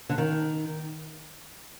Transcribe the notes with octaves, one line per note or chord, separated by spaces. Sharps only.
D3
D#3